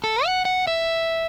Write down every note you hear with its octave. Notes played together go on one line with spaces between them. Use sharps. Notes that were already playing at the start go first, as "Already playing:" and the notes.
A4
F#5
F#5
E5